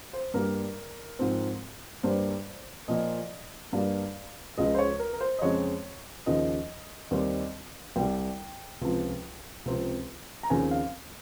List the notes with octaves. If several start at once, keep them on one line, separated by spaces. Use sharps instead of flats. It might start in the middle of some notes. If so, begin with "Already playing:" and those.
C5
G2 G3 A#3 A#4
G#2 F3 C4
G2 G3 A#3 C5
A#2 F3 A#3 D#5
G2 G3 A#3 F5
C#2 C#3 F3 G#3 D#5
C5
C#5
A#4
A#4
C5
D#5
F2 C#3 G#3 C4 C#5
D#2 C#3 F3 D#5
D#2 D#3 G3 C4
C2 C3 G3 G5
C#2 C3 F3
C#2 C3 F3 C4
A#5
D#2 C#3 F3 C4 G#5
F5